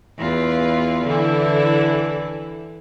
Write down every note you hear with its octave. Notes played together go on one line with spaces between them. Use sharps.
E2 F4 B4
D3 E3 E4